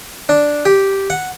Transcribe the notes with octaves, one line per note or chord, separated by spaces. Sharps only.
D4
G4
F#5